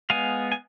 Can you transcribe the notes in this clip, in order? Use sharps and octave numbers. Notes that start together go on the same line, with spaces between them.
G#3 B3 F5 G#5
G#5